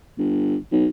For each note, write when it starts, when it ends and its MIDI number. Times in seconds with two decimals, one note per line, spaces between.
0.18 0.56 31
0.72 0.87 35